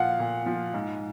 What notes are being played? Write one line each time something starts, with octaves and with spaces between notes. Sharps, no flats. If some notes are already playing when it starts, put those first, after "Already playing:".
Already playing: A#2 F3 F5 F#5
A#2
F3
G#2